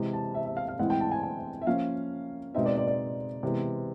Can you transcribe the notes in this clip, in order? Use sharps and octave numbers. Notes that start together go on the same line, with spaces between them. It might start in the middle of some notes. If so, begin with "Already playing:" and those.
Already playing: C3 E3 G#3
A5
E5
E5
F5
F5
A2 E3 G#3 C4 E4 F#5
G5
A5
G#5
G#5
E5
F3 A#3 C#4 F5
B2 G#3 C4 D#4 E5
D5
D5
D5
C3 E3 G#3 B3